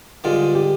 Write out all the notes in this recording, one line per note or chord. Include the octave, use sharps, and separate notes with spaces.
G2 D3 G#3 F4
G4